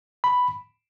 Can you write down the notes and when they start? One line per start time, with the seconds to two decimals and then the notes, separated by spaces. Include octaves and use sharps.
0.24 B5